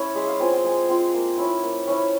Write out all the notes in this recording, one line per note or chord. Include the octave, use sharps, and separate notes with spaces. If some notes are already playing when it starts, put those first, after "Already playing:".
Already playing: C#4 E4 C#5
G#3 E5
F5
C4 F4 G#5
G5
G#3 G#5
C4 F4
A#3
C#4 E4
A#3
C#4 E4